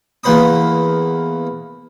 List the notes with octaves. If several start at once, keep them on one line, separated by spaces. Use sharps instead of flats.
E2 A#3 B4 C5 B5 D#6